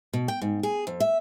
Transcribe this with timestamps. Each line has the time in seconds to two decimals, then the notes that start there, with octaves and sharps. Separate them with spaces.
0.13 B2
0.28 G5
0.42 G#2
0.63 G#4
0.87 F2
1.00 E5